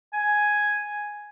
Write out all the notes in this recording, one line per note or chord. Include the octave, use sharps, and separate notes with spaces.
G#5